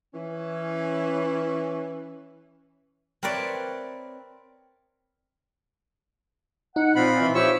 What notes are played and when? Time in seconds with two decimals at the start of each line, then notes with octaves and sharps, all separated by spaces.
0.14 E3 C#4
3.23 C4 A#4 B4 C#5 D5 E5
6.76 D#4 F#5
6.95 A#2 F3 C4 F4 B5
7.20 E3
7.35 F3 F4 G4 C#5 E5 C#6 E6